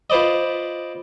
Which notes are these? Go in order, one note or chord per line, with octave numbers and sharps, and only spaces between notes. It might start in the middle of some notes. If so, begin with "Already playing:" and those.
F4 B4 C5 D5 D#5